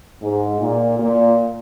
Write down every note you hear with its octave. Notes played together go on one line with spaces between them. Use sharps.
G#2
A#2
A#2